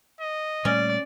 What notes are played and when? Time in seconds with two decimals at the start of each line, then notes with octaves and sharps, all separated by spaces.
0.21 D#5
0.65 A#2 G3 A3 C#4 D5